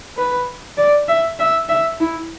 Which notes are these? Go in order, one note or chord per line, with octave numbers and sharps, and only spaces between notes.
B4
D5
E5
E5
E5
E4